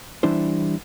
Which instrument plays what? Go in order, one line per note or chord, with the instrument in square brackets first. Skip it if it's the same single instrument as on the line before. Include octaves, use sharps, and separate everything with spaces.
[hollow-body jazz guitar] E3 G3 D4 E4 C5